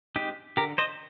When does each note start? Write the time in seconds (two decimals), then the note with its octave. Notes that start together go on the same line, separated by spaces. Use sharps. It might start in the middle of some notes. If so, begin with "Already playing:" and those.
0.16 G#3 C4 D#4 G4
0.57 D3 G4 A#4
0.78 C5 D#5